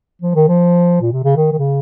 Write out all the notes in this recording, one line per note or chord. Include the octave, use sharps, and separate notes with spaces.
F3
D#3
F3
A#2
C3
C#3
D#3
D#3
C#3